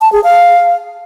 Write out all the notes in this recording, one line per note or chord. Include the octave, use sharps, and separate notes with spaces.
A5
G#4
F5